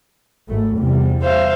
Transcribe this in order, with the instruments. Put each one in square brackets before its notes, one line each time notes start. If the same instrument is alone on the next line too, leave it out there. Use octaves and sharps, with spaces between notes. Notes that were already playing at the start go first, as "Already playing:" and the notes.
[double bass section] G#1 A3
E2 C3 G3
[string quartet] C5 E5 F5